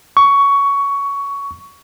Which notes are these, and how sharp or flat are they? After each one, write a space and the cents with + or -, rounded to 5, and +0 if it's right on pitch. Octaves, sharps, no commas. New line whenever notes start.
C#6 +15